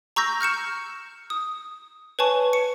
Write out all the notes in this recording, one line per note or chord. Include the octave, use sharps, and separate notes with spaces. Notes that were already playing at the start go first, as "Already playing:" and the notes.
A#5 C#6 E6 G6 A#6
F6 G6 C#7 E7
D#6
B4 C#5 G#5 A5 C#6
C#7